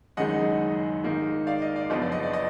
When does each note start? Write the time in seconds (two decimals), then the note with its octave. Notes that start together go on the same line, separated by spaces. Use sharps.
0.17 F#1 F#2 D#3 G#3 D#4 D#5 F#5
1.04 G#2 D#3 A#3 D#4
1.47 D5 F5
1.62 D#5
1.76 D5
1.90 F#1 F2 F3 B3 D4 D#5
2.02 D5
2.12 D#5
2.23 D5
2.33 D#5